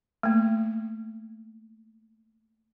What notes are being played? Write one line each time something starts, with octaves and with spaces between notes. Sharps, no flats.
A3 A#3